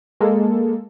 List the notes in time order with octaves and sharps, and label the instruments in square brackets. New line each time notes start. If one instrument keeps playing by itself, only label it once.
[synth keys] G#3 A#3 A4